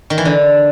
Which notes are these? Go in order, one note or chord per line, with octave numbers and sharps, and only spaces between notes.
D#3
E3
D3